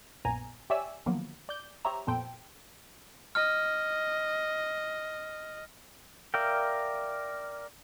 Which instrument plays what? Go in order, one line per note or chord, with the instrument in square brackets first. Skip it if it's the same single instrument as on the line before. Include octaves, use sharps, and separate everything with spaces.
[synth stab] A#1 F#2 A#2 B3 G#5 A#5
G4 C#5 D5 E5 G#5 E6
D3 D#3 F3 F#3 A#3 B3
D5 G6
G4 C5 C#5 E5 A#5
F2 A#2 B3 A4 C5 G5
[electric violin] D#5 [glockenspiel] F6
[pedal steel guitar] A#4 D5 E5 F5 G5